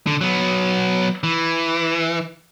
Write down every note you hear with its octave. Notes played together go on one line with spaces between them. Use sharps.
D3
F#3 B3
E3